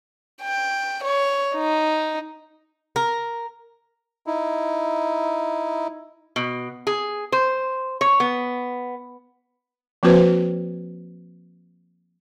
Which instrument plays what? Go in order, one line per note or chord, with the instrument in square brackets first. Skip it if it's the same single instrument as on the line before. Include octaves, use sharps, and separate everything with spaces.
[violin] G5
C#5
D#4
[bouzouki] A#4
[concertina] D#4 E4
[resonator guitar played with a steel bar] B2
G#4
C5
C#5
B3
[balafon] F3 A#3 C4 F#4 B4 C5